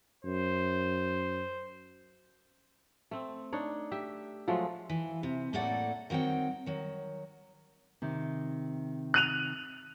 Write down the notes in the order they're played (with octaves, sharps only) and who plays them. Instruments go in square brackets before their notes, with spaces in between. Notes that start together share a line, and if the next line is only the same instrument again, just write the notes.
[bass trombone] F#2 [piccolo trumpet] C5
[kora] A3 C4
D4 D#4 C#5
G4 E5
F3 F#3 G#3 A3
[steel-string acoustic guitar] E3
C3
A2 A3 A#3 A4 D5 F#5
D#3 F#3 C4 F#5 G5
D#3 F#3
[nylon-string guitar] C3 D#3
[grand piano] F#6 D#7 F7